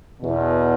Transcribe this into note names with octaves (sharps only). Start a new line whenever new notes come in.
E2 B2